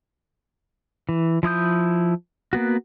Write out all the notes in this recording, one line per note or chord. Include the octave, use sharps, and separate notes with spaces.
E3
F3 E4 D#6 G6
A#3 B3 F#4